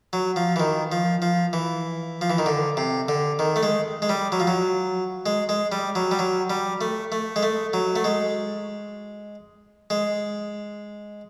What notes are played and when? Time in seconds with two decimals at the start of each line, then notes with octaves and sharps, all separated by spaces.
0.13 F#3
0.36 F3
0.56 E3
0.60 D#3
0.92 F3
1.22 F3
1.53 E3
2.21 F3
2.30 E3
2.38 D#3
2.46 D3
2.77 C3
3.09 D3
3.39 D#3
3.56 A3
3.63 G#3
4.02 G#3
4.09 G3
4.32 F#3
4.40 F3
4.47 F#3
5.26 G#3
5.49 G#3
5.72 G3
5.95 F#3
6.11 G3
6.19 F#3
6.50 G3
6.81 A3
7.12 A3
7.36 G#3
7.43 A3
7.73 F#3
7.96 A3
8.04 G#3
9.90 G#3